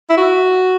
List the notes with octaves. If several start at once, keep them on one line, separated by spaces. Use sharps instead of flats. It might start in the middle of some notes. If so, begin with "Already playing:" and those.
E4
F#4